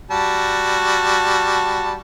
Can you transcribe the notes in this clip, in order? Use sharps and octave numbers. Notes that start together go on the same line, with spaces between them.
G3 F#4 A5